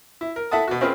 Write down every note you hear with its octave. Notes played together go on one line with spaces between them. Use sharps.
E4
A#4
E4 A4 E5 F#5 A5 D#6
B2 F#4
C4 C#4 F4 G#4 A#4 B4